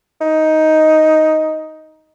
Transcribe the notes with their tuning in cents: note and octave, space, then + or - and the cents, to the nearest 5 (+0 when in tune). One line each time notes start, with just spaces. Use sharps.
D#4 +10